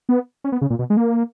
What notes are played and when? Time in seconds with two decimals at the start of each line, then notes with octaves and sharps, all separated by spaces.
0.09 B3
0.44 C#4
0.52 B3
0.61 C#3
0.70 A#2
0.79 B2
0.90 G#3
0.97 A#3